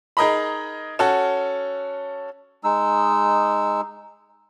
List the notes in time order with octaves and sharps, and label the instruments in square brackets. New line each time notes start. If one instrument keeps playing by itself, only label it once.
[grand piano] D#4 G#4 A#4 D#5 A#5 B5
C#4 F#4 A4 F#5
[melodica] G#3 D#4 E6